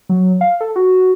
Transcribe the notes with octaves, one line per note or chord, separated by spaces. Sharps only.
F#3
F5
A4
F#4